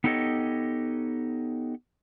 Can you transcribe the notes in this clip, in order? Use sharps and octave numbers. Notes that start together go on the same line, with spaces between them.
B3 D#4 G4 A4 C#5 D#5